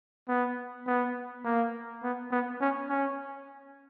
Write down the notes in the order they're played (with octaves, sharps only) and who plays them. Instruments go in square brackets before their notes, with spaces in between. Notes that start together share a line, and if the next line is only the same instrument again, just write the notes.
[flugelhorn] B3
B3
A#3
B3
B3
C#4
C#4